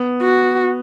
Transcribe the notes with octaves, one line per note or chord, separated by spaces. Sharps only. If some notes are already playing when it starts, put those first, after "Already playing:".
Already playing: B3
F#4